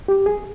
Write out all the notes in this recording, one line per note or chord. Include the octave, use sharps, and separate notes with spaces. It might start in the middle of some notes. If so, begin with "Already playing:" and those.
G4
G#4